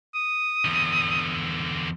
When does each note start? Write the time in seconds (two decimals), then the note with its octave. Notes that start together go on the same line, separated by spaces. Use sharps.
0.15 D#6
0.65 E2 D3